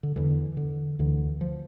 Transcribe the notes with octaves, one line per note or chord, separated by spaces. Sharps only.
D3
E2 D3 E3
D3
D2 D3 E3
F3